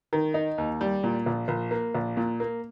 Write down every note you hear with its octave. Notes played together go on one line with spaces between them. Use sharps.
D#3
D#4
D#2
G3
A#2
A#1
A#1
A#3
A#1
A#2
A#3